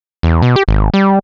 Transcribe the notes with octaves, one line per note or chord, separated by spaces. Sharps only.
E2
B2
G4
G#1
G3